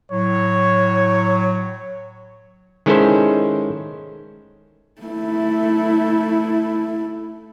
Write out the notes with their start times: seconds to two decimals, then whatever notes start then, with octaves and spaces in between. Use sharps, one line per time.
0.11 A2 F#3 C#5
2.86 D#3 G#3 C#4 E4 A4 C5
5.02 A3 E4